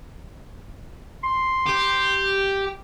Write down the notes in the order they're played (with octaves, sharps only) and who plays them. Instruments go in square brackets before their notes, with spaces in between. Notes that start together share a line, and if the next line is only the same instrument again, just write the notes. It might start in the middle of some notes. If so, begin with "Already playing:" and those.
[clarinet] C6
[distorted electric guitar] G4